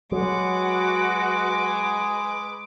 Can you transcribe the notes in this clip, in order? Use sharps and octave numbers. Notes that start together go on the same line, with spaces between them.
F#3 G#3 F#4 B4 F#5 D6